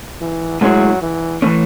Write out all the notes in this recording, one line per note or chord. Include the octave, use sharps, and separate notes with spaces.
E3
A2 F#3 G#3 C#4 E4 G#4
E3
E3 A3 C#4